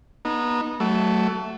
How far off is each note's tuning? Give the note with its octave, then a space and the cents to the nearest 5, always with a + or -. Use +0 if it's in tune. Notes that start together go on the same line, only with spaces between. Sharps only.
B3 -30 D#4 -20
F#3 +25 A3 +0